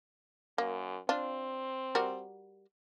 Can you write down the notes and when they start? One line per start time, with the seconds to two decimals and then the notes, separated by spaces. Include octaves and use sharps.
0.58 F#2 A#3
1.09 C4 D4 F4
1.95 G3 F#4 A#4